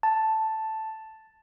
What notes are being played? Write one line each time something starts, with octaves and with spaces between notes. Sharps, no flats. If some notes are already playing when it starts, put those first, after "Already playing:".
A5